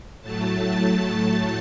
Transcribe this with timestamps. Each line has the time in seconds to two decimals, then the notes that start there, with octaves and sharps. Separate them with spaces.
0.21 A2 F#3 A3 A5
0.60 A5